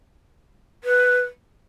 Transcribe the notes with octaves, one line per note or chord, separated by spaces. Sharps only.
B4